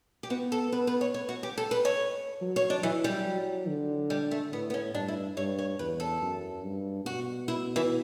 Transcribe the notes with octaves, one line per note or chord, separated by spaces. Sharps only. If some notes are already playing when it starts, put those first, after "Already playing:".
G4
B3 F#4
A4
B3 B4
B4
C#5
C#5
F#4
G4
A4
B4
C#5
F#3
C#5
D4
E3 F#3
G3
F#3
D3
G3
A3
A2 B3
B3
C#4
G2 D4
E4
G2 C#5
C#5
E2 B4
A4
F#2
G2
B2 F#4
E4
E3